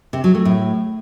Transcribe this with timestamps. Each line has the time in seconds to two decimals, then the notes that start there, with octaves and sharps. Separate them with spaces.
0.13 C3
0.24 F#3
0.35 A3
0.45 A2